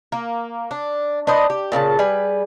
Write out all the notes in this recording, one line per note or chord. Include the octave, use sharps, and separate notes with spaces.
A#3
D4
D4 B4 C5 D#5
G4
A#2 C#3 F#4 A5
G3 G#4 B4